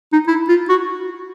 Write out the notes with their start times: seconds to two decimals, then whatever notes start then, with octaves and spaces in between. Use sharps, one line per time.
0.13 D#4
0.27 E4
0.49 F4
0.69 F#4